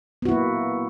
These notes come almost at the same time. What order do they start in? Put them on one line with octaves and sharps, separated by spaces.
B3 F#4 E4 A#3